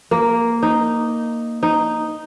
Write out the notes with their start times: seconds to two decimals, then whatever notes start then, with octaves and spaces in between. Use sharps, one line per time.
0.11 A#3
0.63 D#4
1.63 D#4